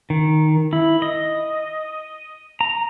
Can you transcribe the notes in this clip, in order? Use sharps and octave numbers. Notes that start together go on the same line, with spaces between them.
D#3
E4
D#5
A#5